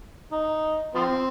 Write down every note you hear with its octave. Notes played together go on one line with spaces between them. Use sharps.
D#4
F3 C4